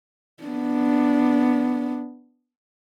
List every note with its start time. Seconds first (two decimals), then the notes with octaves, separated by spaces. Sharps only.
0.44 B3 D4